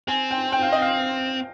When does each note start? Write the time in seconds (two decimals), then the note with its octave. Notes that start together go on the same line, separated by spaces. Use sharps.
0.08 C4 G#5
0.31 G5
0.52 G5
0.62 F5
0.72 D#5
0.82 F5